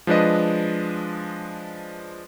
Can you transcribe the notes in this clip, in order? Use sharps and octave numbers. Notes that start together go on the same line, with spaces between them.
F3 G#3 D4 B4 D#5